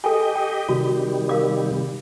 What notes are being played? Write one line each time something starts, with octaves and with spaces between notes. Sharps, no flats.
G4 A4 D#5 G5 G#5
G5
C3 D#3 G3 F#4
A#4 F5 D6